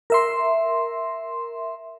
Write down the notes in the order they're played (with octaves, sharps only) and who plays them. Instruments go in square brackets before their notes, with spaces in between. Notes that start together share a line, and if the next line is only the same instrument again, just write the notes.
[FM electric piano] A#4 E5 C6